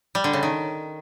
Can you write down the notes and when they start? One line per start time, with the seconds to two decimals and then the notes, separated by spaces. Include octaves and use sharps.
0.15 G3
0.24 D3
0.33 C#3
0.43 D#3